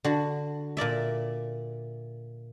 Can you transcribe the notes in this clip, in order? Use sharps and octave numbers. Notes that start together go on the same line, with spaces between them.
D3 F#4
A#2 A#4 D5 E5